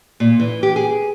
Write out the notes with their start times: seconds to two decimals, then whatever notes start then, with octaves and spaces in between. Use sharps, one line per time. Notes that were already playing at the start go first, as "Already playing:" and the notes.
0.20 A#2
0.40 E3
0.63 G4
0.76 G#4